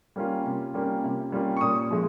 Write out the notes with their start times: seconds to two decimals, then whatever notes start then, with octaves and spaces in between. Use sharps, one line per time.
0.16 G3 A#3 C#4 F4
0.44 C3
0.74 G3 A#3 C#4 F4
1.03 C3
1.32 G3 A#3 C#4 F4
1.57 C#6
1.61 A#2 D#6
1.91 F3 G#3